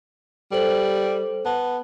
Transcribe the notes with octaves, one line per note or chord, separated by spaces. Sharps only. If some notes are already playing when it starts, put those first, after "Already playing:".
G3 A4 C5 F#7
B3 A5